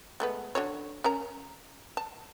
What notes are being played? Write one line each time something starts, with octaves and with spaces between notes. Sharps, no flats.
G#3 A3 B3
D3 F#4 C#5
C#4 A#4 A#5
A5